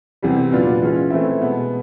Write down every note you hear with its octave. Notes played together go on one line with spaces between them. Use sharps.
E2 C3 E3 G3
A#2 F#3 B3 D4 F4
E3 G#3 C#4 F4
E3 A3 C4 E4
B2 G#3 B3